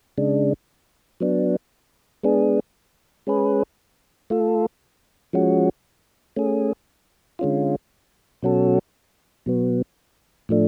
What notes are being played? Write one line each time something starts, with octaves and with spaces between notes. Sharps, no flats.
C#3 G#3 D4
F#3 B3 D4
G#3 B3 D4 G#4
G#3 C#4 G#4 B4
A3 F4 A4
F3 G#3 C#4 F#4
A3 C#4 G#4
D3 G#3 C#4 F4
B2 F#3 C#4 F#4 A4
B2 F#3 B3
A2 F3 A3 D4